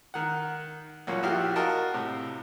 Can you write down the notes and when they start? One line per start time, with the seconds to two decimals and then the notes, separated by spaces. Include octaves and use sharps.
0.14 D#3 F#5
1.07 B1 A#2 A#3 C#4 F#5
1.23 A#1 E4 F#4 G4 F5 F6
1.56 F4 F#4 A#4 D#5 A5
1.94 A2 C3